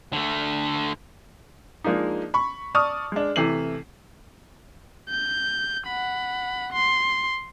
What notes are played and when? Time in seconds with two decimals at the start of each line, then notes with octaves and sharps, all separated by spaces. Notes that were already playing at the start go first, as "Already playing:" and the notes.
0.13 D3 A3
1.84 F3 G#3 A#3 D4 D#4
2.34 B5 C#6
2.75 D5 A5 C#6 D#6 F6
3.12 G#3 D4
3.36 C3 E3 A3 C7 F#7
5.10 G6
5.87 F#5 B5
6.72 C6